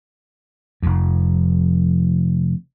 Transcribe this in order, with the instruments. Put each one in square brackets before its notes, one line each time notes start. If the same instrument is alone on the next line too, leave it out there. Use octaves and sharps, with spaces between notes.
[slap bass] F1 F2